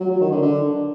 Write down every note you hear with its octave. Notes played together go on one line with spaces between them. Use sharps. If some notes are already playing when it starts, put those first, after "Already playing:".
F#3
F#3
D#3
D3
D3